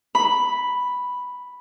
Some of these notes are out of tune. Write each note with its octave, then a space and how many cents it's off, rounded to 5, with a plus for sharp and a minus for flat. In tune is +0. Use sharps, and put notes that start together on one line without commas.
B5 +0